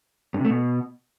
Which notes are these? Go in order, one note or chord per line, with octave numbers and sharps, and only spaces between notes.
G2
C3
A3
B2